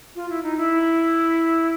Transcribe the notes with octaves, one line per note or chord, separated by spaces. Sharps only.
F4
E4
D#4
E4